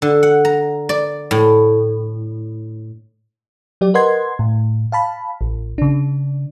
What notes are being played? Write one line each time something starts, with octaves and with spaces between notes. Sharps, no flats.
D3
F#5
A#5
D5
A2
F#3 G4 D5
A#4 B4 D#5 F#5 C6 G#6
A2
F5 A5 B5
A1
C#3 D4